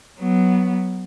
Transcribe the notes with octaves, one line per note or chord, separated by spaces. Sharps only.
F#3 B3